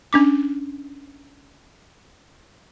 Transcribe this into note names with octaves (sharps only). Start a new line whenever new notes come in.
C#4 D4 D6